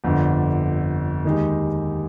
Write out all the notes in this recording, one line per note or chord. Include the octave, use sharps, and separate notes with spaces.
G1 F2 D3
D#2 D#3 G#3 D#4 G4